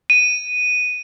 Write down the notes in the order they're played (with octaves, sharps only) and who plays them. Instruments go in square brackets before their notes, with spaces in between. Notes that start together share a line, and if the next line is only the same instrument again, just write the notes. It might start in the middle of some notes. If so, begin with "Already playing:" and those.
[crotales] D#7